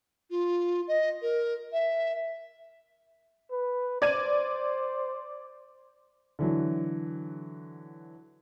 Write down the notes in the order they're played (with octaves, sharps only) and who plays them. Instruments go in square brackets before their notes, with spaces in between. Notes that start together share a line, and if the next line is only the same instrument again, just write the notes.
[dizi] F4
D#5
A#4
E5
[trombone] B4
[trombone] C5 [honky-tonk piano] D5 G#6 D#7
[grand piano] D3 E3 F#3